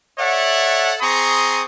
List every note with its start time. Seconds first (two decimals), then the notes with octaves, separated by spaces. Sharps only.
0.19 A4 C#5 D5 E5 F#5
1.01 C4 G#4 A#5 C6 C#6 D#6